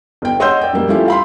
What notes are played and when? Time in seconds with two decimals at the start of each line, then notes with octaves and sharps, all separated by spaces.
0.22 G1 G5
0.40 C#5 D#5 F#5 C6 E6 G6
0.61 D5 G5
0.73 F#2 G3 A#3
0.88 G3 A3 C#4 E4 F4 G4
1.08 F5 B5 C6